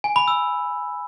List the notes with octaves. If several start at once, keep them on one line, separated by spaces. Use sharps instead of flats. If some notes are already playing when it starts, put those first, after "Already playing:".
G#5
B5
E6